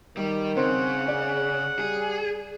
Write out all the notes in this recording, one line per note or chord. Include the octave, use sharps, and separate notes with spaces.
D#3 G3
C#3 C4 F#5
G#4 D5
G3 G#4